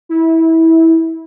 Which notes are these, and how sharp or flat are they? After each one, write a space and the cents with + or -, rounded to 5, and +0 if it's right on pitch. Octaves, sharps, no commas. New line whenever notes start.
E4 -20